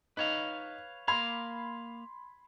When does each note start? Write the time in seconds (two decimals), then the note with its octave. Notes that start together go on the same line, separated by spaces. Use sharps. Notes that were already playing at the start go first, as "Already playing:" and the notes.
0.17 D#4 B4 C#5 F5
1.08 A#3 F5 B5 C6 G#6